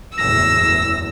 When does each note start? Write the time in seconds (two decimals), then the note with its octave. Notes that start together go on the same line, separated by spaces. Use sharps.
0.17 F#1 E2 A2 E6 A#6